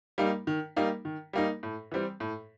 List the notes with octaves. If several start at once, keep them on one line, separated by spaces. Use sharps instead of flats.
G3 A#3 D#4
D#3
G3 A#3 D#4
D#3
G3 A#3 D#4
A2
E3 G3 C4
A2